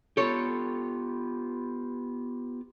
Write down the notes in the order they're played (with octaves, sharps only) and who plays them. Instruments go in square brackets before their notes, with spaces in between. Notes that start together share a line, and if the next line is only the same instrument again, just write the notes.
[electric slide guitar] B3 F4 G4 [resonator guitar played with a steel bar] A4 C#5